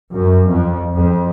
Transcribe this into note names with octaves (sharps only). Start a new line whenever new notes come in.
F#2
F2
F2